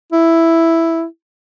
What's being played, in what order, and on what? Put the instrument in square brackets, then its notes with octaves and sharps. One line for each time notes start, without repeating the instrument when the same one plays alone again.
[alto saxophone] E4